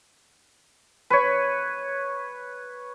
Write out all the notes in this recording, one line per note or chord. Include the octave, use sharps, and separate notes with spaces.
B4 C#5